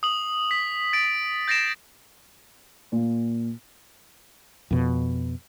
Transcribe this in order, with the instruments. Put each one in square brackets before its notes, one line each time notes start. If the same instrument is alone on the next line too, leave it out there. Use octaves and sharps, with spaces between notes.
[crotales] D#6 F#7
B6
A6 D7
G6 A6 A#6 C7 D7 E7
[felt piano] A#2
[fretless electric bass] F2 B2